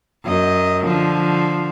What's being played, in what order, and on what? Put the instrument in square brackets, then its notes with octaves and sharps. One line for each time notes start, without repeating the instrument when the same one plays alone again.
[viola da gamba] F#2 D#5
D3 F3